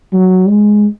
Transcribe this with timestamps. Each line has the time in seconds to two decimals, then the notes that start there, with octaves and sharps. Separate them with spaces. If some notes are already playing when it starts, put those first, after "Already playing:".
0.13 F#3
0.48 G#3